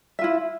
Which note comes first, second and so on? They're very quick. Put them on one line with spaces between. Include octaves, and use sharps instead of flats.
E5 F4 E4